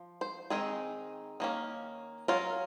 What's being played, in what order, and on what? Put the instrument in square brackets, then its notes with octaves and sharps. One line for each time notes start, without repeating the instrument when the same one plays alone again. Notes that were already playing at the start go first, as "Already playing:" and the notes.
Already playing: [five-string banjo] F3
C5
D#3 G#3 C4 D#4 G#4
D#3 A#3 C#4
F#3 C#4 F4 A#4